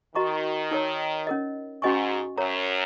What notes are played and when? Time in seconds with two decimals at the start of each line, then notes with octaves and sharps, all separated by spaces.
0.15 D#3 F#4 D#5 A#5 C#6
0.71 D#4 A#4 C#5 A#5
1.27 C#4 A#4 D#5
1.82 G#2 C#4 F#4 D#5 G#5 C#6
2.38 F#2 A#4 C#5 A#5